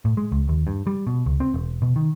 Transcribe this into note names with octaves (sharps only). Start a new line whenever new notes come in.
A2
G#3
C#2
D#2
G2
G3
B2
C#2
C4
E1
B2
D#3